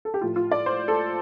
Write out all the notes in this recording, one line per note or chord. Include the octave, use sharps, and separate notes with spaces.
A4
G4
A2 F3 F4
F4
D5
C5
A4